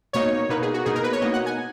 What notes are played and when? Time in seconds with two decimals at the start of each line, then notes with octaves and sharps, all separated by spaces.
0.13 B2 A#3 D#4 C#5
0.49 B2 A#3 D#4 B4
0.62 G#4
0.74 F#4
0.85 B2 A#3 D#4 G#4
0.95 A#4
1.04 B4
1.13 C#5
1.21 B2 A#3 D#4 D#5
1.33 F#5
1.46 G#5